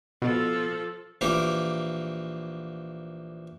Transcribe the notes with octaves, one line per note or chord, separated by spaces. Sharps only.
B2 F3 A4
A#1 E3 A#3 G4 D6